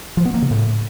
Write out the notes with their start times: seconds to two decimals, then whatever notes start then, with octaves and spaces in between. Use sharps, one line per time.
0.17 F3
0.25 B3
0.34 A#3
0.42 C#3
0.51 A2